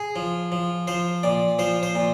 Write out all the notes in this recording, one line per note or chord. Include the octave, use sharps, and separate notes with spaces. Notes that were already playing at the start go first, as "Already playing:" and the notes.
Already playing: G#4
F3
F3
F3 C5
A#2 D5
F3 C5
C5
A#2